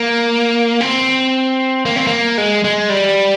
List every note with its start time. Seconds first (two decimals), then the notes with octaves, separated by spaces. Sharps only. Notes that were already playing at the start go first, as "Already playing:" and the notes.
Already playing: A#3
0.81 C4
1.85 A#3
1.96 C4
2.07 A#3
2.38 G#3
2.64 G#3
2.89 G3